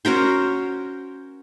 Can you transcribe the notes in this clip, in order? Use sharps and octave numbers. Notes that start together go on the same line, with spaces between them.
C#4 F#4 A#4 C5